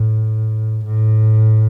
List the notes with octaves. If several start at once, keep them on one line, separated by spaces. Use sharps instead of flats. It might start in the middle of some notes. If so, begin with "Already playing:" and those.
Already playing: A2
A2